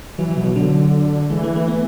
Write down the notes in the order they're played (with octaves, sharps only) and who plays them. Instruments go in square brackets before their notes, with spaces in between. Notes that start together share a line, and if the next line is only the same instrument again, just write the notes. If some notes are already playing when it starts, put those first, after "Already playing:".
[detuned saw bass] E3 [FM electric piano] F#3
[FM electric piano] F#3
[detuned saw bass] B2
[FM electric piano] F#3
[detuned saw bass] D3 [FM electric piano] F#3
[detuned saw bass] E3 [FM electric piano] G#3
[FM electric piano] A3
A3
B3